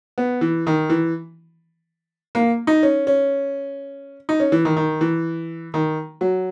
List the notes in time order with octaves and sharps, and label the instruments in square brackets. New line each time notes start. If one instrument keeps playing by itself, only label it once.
[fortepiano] B3
E3
D#3
E3
A#3
D#4
C#4
C#4
D#4
C#4
E3
D#3
D#3
E3
D#3
F#3